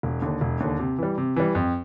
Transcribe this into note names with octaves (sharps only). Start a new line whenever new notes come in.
E1
D#2 D3
E1
D#2 D3
C3
E3 G3
C3
E3 G3
F2